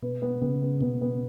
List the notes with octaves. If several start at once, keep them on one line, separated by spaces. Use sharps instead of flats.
B2 B4
B3
C#3 B3
B3
B2 B3
B3